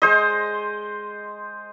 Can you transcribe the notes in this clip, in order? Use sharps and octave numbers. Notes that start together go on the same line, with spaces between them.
G#3 C5 D#5